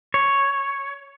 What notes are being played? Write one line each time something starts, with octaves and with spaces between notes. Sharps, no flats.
C#5